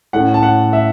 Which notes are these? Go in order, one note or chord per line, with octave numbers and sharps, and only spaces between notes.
A2 A3 C#4 F#5
A5
F#5
E5